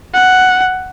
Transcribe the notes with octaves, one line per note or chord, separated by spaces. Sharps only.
F#5